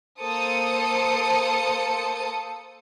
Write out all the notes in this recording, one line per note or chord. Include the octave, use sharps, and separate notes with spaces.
A#3 A4 C5 A5 D#6 C#7